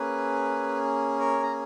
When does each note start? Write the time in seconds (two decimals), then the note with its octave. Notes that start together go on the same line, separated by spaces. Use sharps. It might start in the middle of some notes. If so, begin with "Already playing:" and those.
Already playing: A#3 C#4 G#4 B4
1.19 A#4 C#5
1.43 A#5